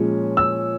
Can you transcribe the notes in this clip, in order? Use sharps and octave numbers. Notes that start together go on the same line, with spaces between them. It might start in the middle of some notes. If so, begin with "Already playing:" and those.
Already playing: A#2 F3 G#3 C#4
E6